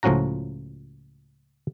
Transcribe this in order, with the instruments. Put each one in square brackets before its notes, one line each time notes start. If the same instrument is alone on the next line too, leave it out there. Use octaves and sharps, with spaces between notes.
[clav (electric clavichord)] C#2 A2 F3 C#4 F#4 A#5